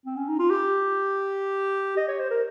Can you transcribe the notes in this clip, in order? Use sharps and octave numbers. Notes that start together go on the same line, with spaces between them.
C4
C#4
D#4
F4
G4
D#5
C#5
C5
A#4